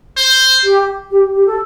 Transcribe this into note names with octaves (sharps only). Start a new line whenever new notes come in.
C5
G4
G4
G4
A4